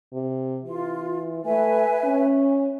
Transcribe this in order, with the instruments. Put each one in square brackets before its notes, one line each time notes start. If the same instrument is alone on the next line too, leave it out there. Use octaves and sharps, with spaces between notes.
[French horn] C3
[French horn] E3 [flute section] F4
[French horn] A3 [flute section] B4 E5 G#5
[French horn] C#4